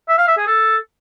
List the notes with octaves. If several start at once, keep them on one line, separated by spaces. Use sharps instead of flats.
E5
F5
E5
G#4
A4